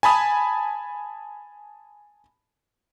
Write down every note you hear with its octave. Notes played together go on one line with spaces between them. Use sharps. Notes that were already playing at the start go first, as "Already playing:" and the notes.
G#5 A5 B5 D#6